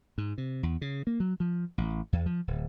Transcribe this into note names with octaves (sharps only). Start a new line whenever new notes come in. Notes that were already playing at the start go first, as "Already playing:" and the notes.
G#2
C3
E2
C#3
A#3
F#3
F3
A1
E2
F3
D1